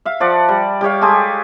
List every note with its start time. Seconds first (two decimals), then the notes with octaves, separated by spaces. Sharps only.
0.05 E5 F5
0.20 F3 D5 F#5
0.49 G3
0.81 G3 G4 C#5 F5
1.02 G#3 G4 A4 G#5